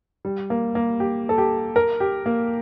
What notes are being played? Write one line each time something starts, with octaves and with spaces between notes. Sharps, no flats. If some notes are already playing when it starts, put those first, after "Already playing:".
G3
A#3
A#3
G4
A4
G4
A#4
G4
A#3